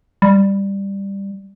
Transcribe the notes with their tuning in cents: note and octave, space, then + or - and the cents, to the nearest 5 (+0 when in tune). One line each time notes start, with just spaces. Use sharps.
G3 +10